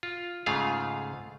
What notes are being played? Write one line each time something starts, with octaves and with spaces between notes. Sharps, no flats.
F4
G#2 C#3 A3 F4 G#4 F5